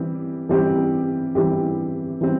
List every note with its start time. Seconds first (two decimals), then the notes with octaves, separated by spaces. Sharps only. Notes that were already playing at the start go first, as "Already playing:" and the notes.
Already playing: E3 G3 C4 G4
0.49 E3 G3 C4 G4
1.35 E3 G3 C4 G4
2.21 E3 G3 C4